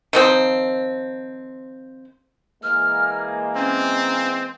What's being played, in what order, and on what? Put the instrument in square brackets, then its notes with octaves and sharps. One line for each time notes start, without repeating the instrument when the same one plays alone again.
[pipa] D#3 F3 C4
[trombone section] E3 G#3 A#3 [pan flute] F6
[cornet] C4 [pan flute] C#4